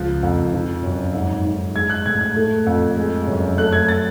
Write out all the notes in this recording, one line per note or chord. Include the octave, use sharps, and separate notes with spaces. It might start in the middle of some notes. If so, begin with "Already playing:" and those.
Already playing: C#2 F3 F#6
F2
F3
F#2
G#2
G#2
G#3 G#6
F#6
A2 G#6
G#6
A3
F2
G#3
F#2
A3 F#6
G#6
A6